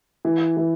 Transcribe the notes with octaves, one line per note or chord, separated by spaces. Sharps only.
E3
E3